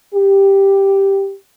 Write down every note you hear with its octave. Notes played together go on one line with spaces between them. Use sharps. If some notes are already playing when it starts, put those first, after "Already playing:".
G4